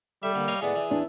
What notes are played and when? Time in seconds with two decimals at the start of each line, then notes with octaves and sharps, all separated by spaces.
0.23 G3 A4 E5
0.35 D3 A#3
0.48 C#5 D#5 F5
0.61 A2 G#3 B3 G#4 D5
0.76 E3
0.90 E2 D4 E4